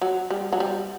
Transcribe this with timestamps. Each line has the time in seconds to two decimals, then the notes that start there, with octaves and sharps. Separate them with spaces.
0.02 F#3
0.30 G3
0.53 F#3
0.60 G3